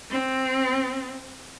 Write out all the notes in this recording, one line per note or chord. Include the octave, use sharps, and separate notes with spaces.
C4